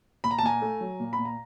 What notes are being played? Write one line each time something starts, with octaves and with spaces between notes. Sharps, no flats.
A#2 B5
A#5
A5
A#2 G#5 A#5
A3
F#3
A#2
B5
A#2
A#5